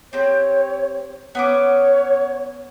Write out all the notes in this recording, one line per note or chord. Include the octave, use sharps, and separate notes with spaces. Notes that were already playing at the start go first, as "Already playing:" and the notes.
C4 G4 C#5
B3 C#4 C#5 D6